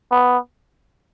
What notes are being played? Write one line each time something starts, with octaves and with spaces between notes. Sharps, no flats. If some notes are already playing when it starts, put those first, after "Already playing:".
B3